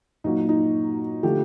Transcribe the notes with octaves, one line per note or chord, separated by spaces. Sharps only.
A#2 F#3 A#3 D#4
D#4
D3 F3 A3 G4 A4